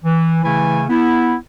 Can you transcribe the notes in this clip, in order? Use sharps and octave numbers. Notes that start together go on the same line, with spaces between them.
E3
C#3 E3 A3 E4 G#5
B3 E4